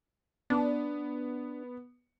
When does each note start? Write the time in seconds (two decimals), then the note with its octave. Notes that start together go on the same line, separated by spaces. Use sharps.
0.50 B3 D4